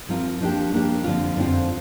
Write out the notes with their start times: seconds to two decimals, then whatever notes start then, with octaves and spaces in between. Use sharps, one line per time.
0.09 F3 C4 F4 A#4
0.40 F3 A#3 D4 G4
0.72 F3 A#3 D4 G4
1.04 F2 D3 F3 C4 F4
1.36 F2 D3 F3 C4 F4